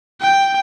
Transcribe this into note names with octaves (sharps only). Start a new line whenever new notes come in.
G5